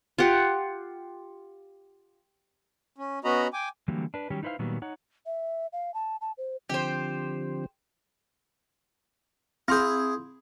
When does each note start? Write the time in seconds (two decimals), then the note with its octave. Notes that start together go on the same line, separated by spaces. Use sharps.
0.18 F4 G4 F#5
2.98 C#4
3.24 B3 C#4 F#4 D#5 A#5 B5
3.53 G5 G#5 D6
3.88 D3 E3 F#3 G3 A#3
4.14 D4 B4
4.30 D#3 F#3 G3 C#4 G4
4.43 D#4 E4 B4 C5 F5
4.59 A#2 D#3 F#3 G3 B3
4.82 D#4 C#5 F#5
5.26 E5
5.73 F5
5.94 A5
6.21 A5
6.38 C5
6.70 D3 F3 C4 G4 C5
9.68 C4 E4 G#4 C6 G6